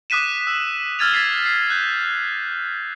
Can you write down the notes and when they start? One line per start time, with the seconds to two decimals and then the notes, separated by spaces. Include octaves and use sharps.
0.10 D6 D#6 F#6 B6 D#7 E7
0.47 E6
0.99 E6 F6 G#6 A6 D#7 F7
1.14 G#6 A6 B6 C7
1.46 C7
1.70 F#6 G6